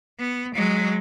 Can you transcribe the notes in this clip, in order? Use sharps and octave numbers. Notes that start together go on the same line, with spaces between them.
B3
F#3 G#3